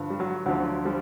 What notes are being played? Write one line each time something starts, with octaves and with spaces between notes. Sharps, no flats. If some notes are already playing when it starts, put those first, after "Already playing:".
Already playing: G2 D3 F3
G3
F#3
D2 D3 F3 F#3
F3 G3